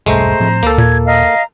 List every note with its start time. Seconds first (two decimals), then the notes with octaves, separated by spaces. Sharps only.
0.06 E1 B1 G2 G#3 A3 C5 A#5
0.40 A2 F3 C4
0.63 C#2 A#3 A4
0.78 D#2 A#2 G#6
1.06 D#5 F5 A#5